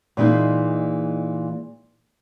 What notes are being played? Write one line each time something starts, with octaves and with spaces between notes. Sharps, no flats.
A#2 E3 G#3 D#4